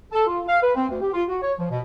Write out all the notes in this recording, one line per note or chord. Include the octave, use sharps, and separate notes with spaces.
A4
F4
F5
B4
C4
D2
G4
F4
F#4
C#5
F3
B2